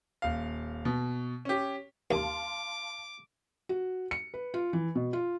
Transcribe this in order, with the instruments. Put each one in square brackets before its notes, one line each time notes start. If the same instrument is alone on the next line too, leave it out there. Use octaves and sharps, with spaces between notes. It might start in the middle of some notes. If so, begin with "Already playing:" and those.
[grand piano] D#1 F5
B2
C#4 G4
[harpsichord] D#2 [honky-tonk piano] F5 A5 C6 [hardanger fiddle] D6
[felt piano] F#4
C#7
B4
F4
E3
B2
F4